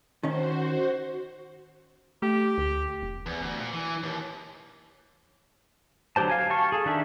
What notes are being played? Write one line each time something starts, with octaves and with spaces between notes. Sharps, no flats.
D#3 C#4 F#4 C5
A3 G4
D2
E1
E2
D2
A#2
E3
D#2
D3 F#3 G4 C5 A5
F5 G#5
G4 F5 A5 C#6
G#4 A4
D#3 D4 G4 E5